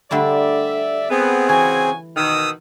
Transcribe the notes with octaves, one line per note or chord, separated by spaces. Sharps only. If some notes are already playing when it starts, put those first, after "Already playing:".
D3 G3 A3 D5 E5
B3 C4 G#4
C#3 E3 F#4 G#5
B2 D#3 D#6 E6